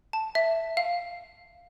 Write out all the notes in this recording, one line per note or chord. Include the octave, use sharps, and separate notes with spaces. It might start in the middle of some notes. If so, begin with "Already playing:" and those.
A5
E5
F5